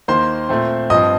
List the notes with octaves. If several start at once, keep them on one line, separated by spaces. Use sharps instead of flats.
D#2 D#3 A#3 C5 C6
A#2 A3 C4
G2 F3 C4 D#5 D#6